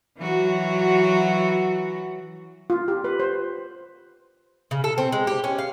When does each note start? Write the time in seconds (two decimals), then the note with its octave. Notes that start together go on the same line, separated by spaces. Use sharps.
0.18 E3 F#3 F#4
2.70 F4
2.88 G4
3.04 B4
3.20 C5
4.71 C#3
4.84 A4
4.98 C4
5.12 G#3
5.27 G4
5.44 C#4
5.59 F5